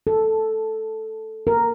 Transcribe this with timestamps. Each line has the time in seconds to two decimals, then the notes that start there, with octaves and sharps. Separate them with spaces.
0.07 A4
1.47 A#4